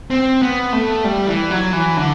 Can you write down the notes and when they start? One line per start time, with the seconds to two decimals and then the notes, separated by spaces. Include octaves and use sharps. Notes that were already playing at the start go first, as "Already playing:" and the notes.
0.10 C4
0.42 B3
0.73 A3
1.04 G3
1.28 E3
1.51 F#3
1.73 E3
1.97 D3